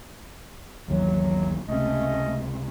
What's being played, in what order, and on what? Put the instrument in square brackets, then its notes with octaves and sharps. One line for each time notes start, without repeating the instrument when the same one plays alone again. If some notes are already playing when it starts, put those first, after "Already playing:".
[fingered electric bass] G1 D#2 E3 [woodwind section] F#3
[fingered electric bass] C#2 C3 [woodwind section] A3 C#4 D#5